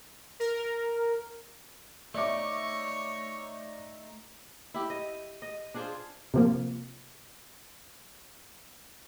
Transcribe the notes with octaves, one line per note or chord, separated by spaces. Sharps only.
A#4
A3 D#4 C#5 D5 E5 D6
E4 G4
D#5
D#5
D4 F4 G#4 C5
C3 F3 A#3